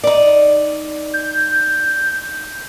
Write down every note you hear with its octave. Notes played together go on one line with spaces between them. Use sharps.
D#4 D5
G6